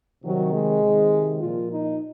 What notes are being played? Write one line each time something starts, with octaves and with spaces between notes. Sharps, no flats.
C3 D#3 F#3
G#3
C3 D#3
A#2 F3 F4
D#4